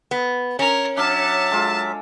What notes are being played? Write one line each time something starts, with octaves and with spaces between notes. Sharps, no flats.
B3
C#4 A#4
F#3 D4 E5 F5 A5
G#3 F4 A4